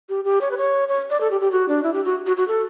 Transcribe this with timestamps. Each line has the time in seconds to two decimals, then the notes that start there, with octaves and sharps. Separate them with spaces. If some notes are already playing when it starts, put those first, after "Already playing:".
0.09 G4
0.25 G4
0.41 C#5
0.51 B4
0.57 C#5
0.89 C#5
1.10 D5
1.21 A4
1.31 G4
1.41 G4
1.52 F#4
1.68 D4
1.83 E4
1.94 G4
2.05 F#4
2.27 F#4
2.37 F#4
2.48 A4